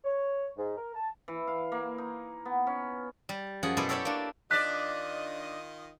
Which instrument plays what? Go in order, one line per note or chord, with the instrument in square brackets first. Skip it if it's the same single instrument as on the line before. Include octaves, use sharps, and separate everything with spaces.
[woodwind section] C#5
G#2
A#4
A5
[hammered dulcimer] E3
F5
A#3
D#4
B3
C#4
[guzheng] G3
F#2 F3 G#4 F#5
B2 E4 A4 B4 C5 D5
G4 A4 C#5 D5 E5 G5
A#3 D4
[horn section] D#3 F4 D#5 [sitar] D4 D5 [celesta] F#6 B6